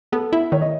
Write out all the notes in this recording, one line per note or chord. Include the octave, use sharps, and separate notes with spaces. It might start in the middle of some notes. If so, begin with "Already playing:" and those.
B3 A4
E4 E5
D#3 C#5
D#5